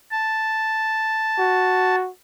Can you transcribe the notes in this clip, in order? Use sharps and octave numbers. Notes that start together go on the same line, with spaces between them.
A5
F#4